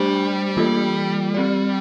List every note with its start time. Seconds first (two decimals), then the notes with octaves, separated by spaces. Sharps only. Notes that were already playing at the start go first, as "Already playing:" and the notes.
Already playing: G3 A3 D4 G4 C5
0.57 E3 A#3 F4 A4
1.34 C4 G4 D5